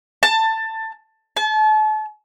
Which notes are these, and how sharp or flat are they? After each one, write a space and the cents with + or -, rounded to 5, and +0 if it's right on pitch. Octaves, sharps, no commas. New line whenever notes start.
A5 +20
A5 -35